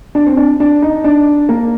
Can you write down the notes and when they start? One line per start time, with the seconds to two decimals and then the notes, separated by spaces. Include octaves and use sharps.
0.15 D4
0.27 C4
0.37 D4
0.60 D4
0.82 D#4
1.04 D4
1.49 A#3